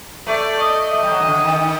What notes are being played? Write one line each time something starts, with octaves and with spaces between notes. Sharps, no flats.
A3 D5
D#5
A3 D#5
G3
F#3
D#3
D3
D#3
D#3